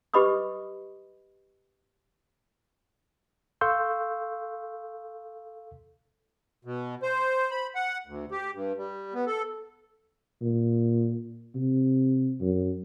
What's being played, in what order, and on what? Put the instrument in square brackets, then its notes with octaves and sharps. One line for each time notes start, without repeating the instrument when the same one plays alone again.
[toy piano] G4 B4 D#5 B5 D6 D#6
[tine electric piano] A4 F5 C6 C#6 E6 G6
[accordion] B2
C5
B5
F#5
D2
G4
G2
G3
B3
A4
[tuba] A#2
C3
F#2